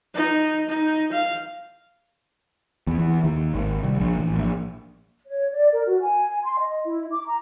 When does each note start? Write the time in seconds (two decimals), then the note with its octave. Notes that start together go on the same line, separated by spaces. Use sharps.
0.15 D#4
0.69 D#4
1.13 F5
2.87 E2
2.99 E2
3.24 D#2
3.54 G#1
3.83 C2
3.99 A#1
4.19 A1
4.37 A#1
5.27 C#5
5.53 D5
5.73 A#4
5.86 F#4
6.02 G#5
6.44 C6
6.59 D#5
6.85 E4
7.11 D6
7.27 A#5